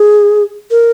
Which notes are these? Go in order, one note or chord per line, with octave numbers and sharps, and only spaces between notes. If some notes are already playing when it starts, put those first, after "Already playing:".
Already playing: G#4
A#4